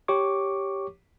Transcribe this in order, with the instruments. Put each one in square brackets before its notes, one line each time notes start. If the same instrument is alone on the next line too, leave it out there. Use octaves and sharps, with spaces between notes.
[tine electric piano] G4 C#5 C#6 D6